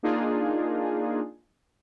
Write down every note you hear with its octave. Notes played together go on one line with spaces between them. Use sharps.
A#3 D4 D#4 F4 G#4